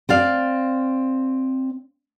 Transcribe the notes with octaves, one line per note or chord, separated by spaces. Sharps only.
C4 D5 F5